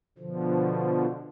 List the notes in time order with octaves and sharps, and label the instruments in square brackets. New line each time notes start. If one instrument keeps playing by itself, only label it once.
[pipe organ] B2 D3 F3